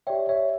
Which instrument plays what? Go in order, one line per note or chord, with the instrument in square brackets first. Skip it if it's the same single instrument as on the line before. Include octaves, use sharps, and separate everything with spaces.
[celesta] G4 D5 G5 [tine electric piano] C#5 E5
[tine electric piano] C#5 E5